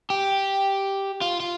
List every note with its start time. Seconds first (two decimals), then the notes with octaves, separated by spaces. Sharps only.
0.10 G4
1.21 F4
1.40 F4